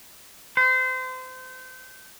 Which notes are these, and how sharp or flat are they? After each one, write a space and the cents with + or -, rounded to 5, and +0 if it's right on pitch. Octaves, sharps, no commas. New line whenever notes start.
C5 -30